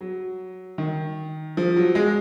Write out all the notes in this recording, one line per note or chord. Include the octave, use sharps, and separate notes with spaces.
F#3
D#3
F3
F#3
G#3